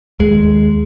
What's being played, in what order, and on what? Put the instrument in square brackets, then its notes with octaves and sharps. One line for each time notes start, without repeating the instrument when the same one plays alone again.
[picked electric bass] D#2 G#3